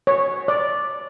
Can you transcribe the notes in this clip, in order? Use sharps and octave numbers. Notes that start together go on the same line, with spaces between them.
C#5
D5